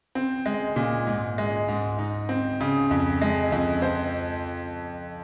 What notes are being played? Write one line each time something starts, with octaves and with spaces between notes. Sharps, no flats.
C4
G#3
A#2
G#2
G#3
G#2
D#4
C4
C#3
F2
G#3
F2
C5